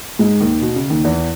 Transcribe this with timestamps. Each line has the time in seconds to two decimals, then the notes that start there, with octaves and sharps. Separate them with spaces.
0.19 G#2 G#3
0.40 D#2 D#3
0.61 B2
0.76 C#3
0.89 D#2 D#3
1.04 E2 E3